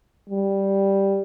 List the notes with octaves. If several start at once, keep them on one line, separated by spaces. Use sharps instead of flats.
G3